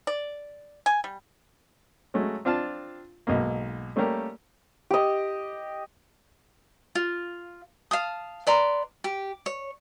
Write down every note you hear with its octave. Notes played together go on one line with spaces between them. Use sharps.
D5
G#5
G3
F#3 G#3 A3 C#4
C4 D4 F4 F5 A5
B1 G#2 B2 A#3
G3 A3 A#3 C#4 G4 A#4
G4 D#5
F4
F5 A5 D#6
B4 D5 A#5 C6
G4
C#5